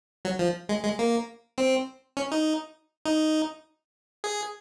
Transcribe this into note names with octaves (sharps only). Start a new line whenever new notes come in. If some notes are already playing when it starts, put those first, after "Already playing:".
F#3
F3
G#3
G#3
A#3
C4
C#4
D#4
D#4
G#4